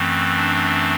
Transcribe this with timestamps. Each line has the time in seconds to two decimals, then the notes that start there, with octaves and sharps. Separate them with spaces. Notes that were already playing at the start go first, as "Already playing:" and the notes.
Already playing: F#2 E3 A3 C4
0.37 D4